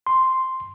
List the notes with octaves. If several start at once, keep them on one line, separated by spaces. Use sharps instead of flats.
C6